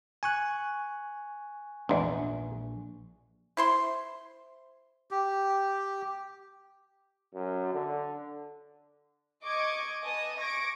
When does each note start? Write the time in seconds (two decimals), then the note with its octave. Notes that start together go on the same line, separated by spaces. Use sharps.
0.23 G#5 C#6 F#6
1.89 A#1 E2 G#2 D4
3.57 E4 C5 C6
5.11 G4
7.34 F#2
7.73 D3
9.44 D#5 C#6 D6 G#6
10.02 B4 D#5 G#5 A5 D#6
10.38 C#6 D6 G#6 A#6 D7